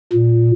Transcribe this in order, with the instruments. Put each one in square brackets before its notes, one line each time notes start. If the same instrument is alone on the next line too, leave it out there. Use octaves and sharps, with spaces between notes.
[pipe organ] A#2